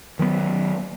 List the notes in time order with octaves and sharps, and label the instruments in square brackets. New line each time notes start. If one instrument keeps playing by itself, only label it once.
[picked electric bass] D#3 F#3 G#3 B3